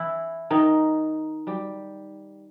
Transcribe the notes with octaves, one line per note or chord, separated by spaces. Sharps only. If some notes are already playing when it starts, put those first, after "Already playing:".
Already playing: E3 E4
D#3 D#4
G3 G4